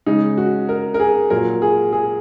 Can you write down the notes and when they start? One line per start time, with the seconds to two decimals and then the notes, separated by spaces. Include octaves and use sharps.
0.06 C#3 G#3 D#4
0.37 F#4
0.69 A#4
0.94 A#4
1.00 G#4
1.30 A#2 F#3 A#4
1.62 G#4
1.93 G#4